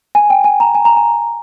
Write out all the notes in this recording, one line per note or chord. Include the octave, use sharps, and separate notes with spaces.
G#5
G5
G#5
A#5
G#5
A#5
G#5